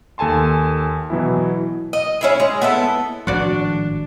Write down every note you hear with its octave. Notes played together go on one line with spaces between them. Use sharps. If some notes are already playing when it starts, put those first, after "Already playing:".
D#2 A4 G#5 A5 C6
B2 E3 F#3 B3 E4
D#5
C#4 E4 G#4
G#3
B3 E4 A4
G#1 A2 F3 D4 F#4 D5